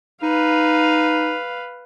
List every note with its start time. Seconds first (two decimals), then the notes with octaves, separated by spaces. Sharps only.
0.23 D#4 B4 F5